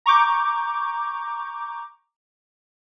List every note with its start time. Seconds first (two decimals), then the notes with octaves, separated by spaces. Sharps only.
0.06 A#5 C#6 D6 G6